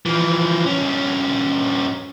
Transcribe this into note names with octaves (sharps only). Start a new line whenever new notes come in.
E3 F3
G2 C#4